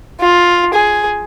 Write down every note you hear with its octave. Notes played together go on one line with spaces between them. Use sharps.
F4
G#4